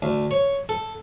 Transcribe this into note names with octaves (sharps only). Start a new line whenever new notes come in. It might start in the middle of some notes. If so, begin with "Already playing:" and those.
D2
C#5
A4